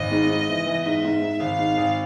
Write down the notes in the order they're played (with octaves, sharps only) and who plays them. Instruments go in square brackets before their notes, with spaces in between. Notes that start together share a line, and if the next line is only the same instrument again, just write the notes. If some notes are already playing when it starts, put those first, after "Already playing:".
Already playing: [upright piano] G#1 [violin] D#5
[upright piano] G#2
G#2
E3
E3
[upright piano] G#2 [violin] E5
[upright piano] G#2
G#2
[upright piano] G#1 [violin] F5
[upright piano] G#2
G#1